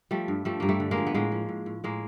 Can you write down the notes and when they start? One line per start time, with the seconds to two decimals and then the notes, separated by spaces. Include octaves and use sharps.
0.11 F3 G3 A3
0.28 G2
0.45 F3 G3 A3
0.60 G2 A#3
0.69 G3 A3
0.80 D3
0.91 G#3 A#3
0.97 F3
1.07 B3
1.14 A2 G#3 A#3
1.32 F3
1.49 A2
1.66 A2
1.84 A2 G#3 A#3